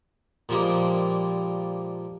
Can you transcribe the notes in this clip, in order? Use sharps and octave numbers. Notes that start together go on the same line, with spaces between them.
A#2 F3 G3 G#3 A#3